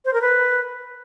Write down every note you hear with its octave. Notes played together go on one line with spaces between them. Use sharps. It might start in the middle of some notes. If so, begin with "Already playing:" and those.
C5
A#4
B4